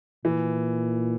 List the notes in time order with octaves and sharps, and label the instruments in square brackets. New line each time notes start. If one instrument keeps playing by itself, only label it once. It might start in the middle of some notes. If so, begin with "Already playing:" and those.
[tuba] A#2 [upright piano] E3